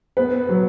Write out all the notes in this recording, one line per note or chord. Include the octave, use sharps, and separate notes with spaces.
B3 B4
F#3